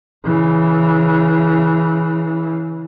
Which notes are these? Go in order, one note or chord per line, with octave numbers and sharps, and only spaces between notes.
C#3 E3